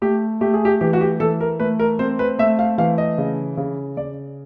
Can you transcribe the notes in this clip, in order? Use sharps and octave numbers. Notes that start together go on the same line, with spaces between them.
A3 G4
A3 G4
G#4
G4
E3 G4
F#4
G4
E3 A4
A#4
A3 B4
A#4
C4 C5
B4
A3 E5
F5
E3 F5
D#5
C#3
C#3
C#3 D5